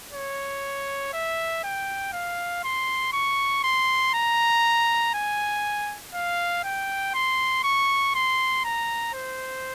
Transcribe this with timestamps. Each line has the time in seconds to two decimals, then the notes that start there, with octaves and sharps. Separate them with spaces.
0.13 C#5
1.13 E5
1.64 G5
2.13 F5
2.64 C6
3.13 C#6
3.64 C6
4.14 A#5
5.14 G#5
6.14 F5
6.64 G5
7.14 C6
7.64 C#6
8.15 C6
8.65 A#5
9.14 C5